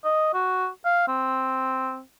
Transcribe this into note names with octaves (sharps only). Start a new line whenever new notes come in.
D#5
F#4
F5
C4